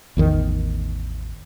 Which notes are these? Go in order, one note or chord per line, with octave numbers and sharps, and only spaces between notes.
A1 E2 D#3